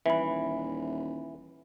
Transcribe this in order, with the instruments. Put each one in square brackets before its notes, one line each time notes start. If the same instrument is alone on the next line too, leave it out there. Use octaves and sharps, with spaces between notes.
[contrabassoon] D#1 [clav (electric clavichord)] E3 [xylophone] E5 B5